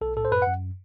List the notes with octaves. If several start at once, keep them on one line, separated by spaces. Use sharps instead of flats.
B1 A4
A2 A4
C5
F#2 B4
F#5
F#2